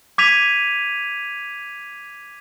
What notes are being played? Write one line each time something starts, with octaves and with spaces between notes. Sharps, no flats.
D6 G#6 B6 D#7 F7